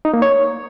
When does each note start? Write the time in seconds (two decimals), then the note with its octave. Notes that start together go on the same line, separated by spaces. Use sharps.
0.05 D#4
0.14 A#3
0.22 C#5